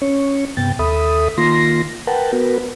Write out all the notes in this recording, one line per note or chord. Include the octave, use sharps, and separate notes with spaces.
C#4 C#5
G2 C3 B3 G5 A6
D#2 A4 E5 B5 D#6
D#3 A#3 F4 C6 A#6
A#4 B4 F#5 G5 A5
B3 F#4 A#4 B4